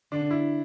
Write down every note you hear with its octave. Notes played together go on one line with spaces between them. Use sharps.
D3 D4
E4